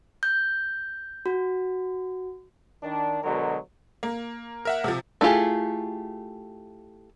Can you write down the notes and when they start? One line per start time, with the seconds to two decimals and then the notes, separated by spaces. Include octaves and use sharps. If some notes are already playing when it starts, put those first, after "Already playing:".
0.23 G6
1.26 F#4
2.83 D#3 D4
3.24 B2 D3 F#3 G#3 A#4
4.03 A#3
4.65 A#4 E5 F#5
4.84 C3 F3
5.21 A3 E4 F4 G4 G#4